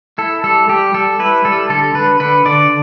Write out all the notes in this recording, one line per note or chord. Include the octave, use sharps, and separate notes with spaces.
E4 A4
G3 A4
G3 G4
G3 A4
E4 B4
G3 A4
D3 A4
D3 B4
D3 B4
D3 D5